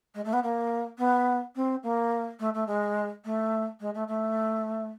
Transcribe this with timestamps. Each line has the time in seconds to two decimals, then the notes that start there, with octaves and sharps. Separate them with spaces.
0.14 G#3
0.25 A3
0.33 B3
0.43 A#3
0.98 B3
1.56 C4
1.83 A#3
2.39 A3
2.54 A3
2.67 G#3
3.25 A3
3.80 G#3
3.95 A3
4.08 A3